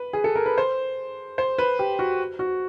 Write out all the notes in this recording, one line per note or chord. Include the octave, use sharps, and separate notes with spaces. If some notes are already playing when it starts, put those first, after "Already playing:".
Already playing: B4
G#4
A4
A#4
B4
C5
C5
B4
G4
F#4
F#4